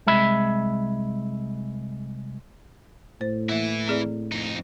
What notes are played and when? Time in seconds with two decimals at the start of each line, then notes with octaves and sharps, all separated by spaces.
0.07 C2 G#3 E5 B5
3.21 A2 C5
3.49 E3 A#3 E4 E5
3.88 C4 G#4 D5
4.32 F2 D#4